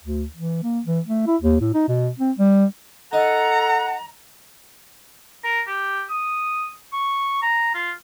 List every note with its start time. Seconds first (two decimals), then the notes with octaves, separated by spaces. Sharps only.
0.04 D2
0.36 E3
0.63 A#3
0.86 E3
1.07 A3
1.27 E4
1.42 D#2
1.60 A2
1.74 D#4
1.88 B2
2.19 C4
2.39 G3
3.13 D#4 A4 D#5 F#5 A#5
5.44 A#4
5.67 G4
6.10 D#6
6.93 C#6
7.42 A#5
7.75 F4